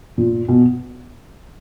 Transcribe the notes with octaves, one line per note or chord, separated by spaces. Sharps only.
A#2
B2